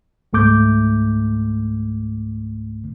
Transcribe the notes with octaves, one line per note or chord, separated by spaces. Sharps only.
C#2 G#2 A3 D6 G6